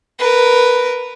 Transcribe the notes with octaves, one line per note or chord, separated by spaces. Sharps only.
A#4 B4